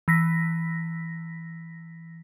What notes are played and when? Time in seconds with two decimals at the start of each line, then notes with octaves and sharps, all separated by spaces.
0.08 E3 A#6 B6